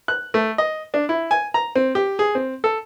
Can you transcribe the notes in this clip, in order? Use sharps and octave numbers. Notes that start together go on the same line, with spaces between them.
F#6
A3
D#5
D4
E4
G#5
A#5
C4
G4
G#4
C4
A4